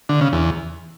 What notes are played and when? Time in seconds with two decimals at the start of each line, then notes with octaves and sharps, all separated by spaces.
0.09 D3
0.21 C#3
0.33 E2